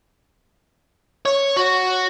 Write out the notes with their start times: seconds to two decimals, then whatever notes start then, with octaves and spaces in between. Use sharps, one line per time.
1.25 C#5
1.56 F#4